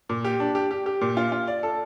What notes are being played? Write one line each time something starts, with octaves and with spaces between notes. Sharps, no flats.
A#2
G4
D4
G4
G4
G4
A#2
F4
F4
D5
A4